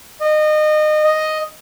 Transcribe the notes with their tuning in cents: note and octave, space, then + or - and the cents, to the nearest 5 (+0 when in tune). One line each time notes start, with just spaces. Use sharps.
D#5 -25
D#5 +0